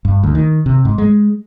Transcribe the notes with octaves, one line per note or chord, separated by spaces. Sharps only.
G2
D2
D#3
C3
G#2
G#3